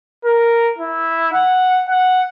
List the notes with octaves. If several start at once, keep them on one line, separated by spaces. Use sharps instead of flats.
A#4
E4
F#5
F#5